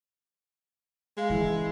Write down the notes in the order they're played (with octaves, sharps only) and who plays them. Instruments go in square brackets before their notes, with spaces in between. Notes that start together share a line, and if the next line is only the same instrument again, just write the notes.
[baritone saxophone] G#3 [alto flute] F5
[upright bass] E3 C#4 [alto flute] E4